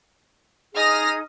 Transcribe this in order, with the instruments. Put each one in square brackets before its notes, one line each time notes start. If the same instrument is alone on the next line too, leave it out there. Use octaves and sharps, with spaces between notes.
[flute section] D#4 G#4 [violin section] D#6 F6 A#6